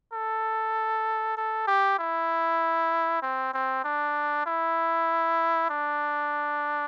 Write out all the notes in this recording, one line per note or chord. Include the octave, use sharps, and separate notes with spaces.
A4
A4
G4
E4
C4
C4
D4
E4
D4